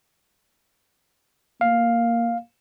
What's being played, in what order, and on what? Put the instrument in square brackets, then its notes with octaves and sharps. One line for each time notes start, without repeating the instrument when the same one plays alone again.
[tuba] A#3 [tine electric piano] F5